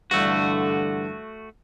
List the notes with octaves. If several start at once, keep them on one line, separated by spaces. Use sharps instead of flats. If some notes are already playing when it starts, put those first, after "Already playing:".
G2 D3 E3 G3 A3 F#4